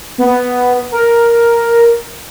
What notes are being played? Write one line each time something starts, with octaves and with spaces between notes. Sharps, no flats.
B3
A#4